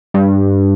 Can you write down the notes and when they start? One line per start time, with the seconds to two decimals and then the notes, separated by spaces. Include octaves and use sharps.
0.14 G2